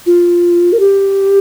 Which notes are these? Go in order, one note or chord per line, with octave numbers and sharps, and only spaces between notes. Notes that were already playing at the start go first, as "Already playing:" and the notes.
F4
A#4
G4